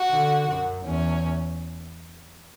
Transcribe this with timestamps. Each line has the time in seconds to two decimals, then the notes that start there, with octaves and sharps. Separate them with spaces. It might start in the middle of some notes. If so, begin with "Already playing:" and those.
Already playing: F#4
0.11 D3
0.49 F#2
0.86 E2 C#4